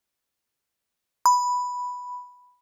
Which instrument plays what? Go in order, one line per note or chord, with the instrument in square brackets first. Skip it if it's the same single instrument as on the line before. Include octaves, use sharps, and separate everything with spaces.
[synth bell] B5